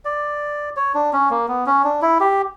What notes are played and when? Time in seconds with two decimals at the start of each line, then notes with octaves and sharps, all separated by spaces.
0.05 D5
0.76 C#5
0.94 D4
1.13 C#4
1.30 A#3
1.48 B3
1.66 C#4
1.84 D4
2.02 E4
2.20 G4